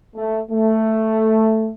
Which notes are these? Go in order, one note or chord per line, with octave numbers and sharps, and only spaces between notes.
A3
A3